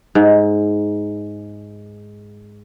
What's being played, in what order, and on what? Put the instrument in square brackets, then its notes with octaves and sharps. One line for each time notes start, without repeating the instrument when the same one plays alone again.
[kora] G#2